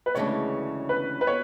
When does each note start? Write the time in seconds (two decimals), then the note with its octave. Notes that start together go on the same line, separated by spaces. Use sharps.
0.06 B4
0.15 D2 C#3 E3 G#3 D4 C#5
0.89 B4
1.21 B4
1.27 C#5